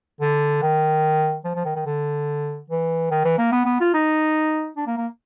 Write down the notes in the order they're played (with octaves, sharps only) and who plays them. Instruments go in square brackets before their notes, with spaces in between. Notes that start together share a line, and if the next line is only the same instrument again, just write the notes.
[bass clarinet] D3
D#3
F3
F3
D#3
D#3
D3
E3
D#3
E3
A#3
B3
B3
F4
D#4
D4
A#3
A#3